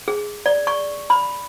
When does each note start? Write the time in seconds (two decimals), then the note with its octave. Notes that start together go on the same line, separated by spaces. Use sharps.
0.08 G#4
0.46 D5
0.67 C#6
1.10 B5